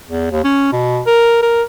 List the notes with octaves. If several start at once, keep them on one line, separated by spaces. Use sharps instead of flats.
E2
D#2
C#4
B2
A#4
A#4